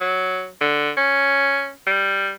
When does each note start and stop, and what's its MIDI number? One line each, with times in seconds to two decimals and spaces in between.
0.01 0.49 54
0.61 0.91 50
0.97 1.70 61
1.86 2.30 55